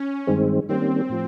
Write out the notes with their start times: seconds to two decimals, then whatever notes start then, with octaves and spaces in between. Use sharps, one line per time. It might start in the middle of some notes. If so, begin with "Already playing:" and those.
Already playing: C#4
0.27 G2 D#3 G#3 C4
0.69 D#3 G3 A#3 C4 C#4
1.09 A2 F3